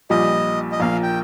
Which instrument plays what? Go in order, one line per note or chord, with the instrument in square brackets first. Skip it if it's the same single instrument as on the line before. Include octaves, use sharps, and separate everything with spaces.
[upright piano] A#1 A#2 G3 [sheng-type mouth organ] D#5
[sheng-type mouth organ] D#5
[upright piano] A#1 A#2 A#3 [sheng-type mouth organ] F5
[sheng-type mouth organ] G5